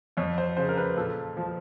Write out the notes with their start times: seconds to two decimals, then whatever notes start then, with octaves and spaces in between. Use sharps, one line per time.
0.17 F2 C#5
0.38 C5
0.57 C#3 C5
0.69 A#4
0.77 B4
0.97 A#2 A4
1.37 F3